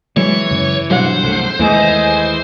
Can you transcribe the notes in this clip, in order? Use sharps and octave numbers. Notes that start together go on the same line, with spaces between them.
E3 F#3 G#3 C#5
F#2 C#3
G2 B2 F#3 C5 F#5
C2 A3
D#2 E3 G#3 A3 G#4 D#5